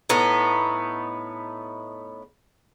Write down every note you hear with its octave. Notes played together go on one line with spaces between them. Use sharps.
A2 B3 D#4